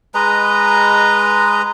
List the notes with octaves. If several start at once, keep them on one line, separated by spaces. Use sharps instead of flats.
G#3 B4 D#5 A#5